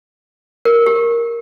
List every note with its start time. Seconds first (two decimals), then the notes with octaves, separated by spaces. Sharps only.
0.65 A#4
0.86 G4